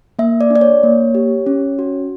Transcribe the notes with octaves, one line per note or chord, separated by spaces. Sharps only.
A#3 E5
D5
D4
D5
C#5
A#3
G4
C#4
F#4